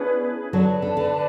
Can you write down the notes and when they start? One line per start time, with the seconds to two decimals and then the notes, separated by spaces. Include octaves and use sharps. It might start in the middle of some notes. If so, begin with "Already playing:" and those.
Already playing: B3 C#4 D4 E4 G#4 B4
0.53 D3 F#3 B4 D5 A5
0.82 D3
0.97 D3